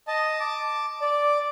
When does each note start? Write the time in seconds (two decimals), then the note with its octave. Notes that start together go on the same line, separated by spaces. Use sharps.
0.08 D#5 A5
0.40 A5 D6
1.01 D5